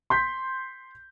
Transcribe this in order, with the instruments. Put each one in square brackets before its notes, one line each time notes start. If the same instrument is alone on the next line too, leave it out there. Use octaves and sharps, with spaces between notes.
[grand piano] C6 G6 B6